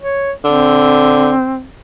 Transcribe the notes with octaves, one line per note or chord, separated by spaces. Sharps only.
C#5
D3 C4